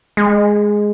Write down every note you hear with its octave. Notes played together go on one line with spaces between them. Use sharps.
G#3